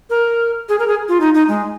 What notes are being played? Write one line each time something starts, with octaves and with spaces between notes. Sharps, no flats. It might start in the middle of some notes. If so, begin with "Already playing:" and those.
A#4
G#4
A#4
G#4
F4
D#4
D#4
G#3